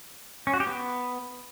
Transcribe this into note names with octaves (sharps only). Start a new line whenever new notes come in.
C#4
F#4
G4
B3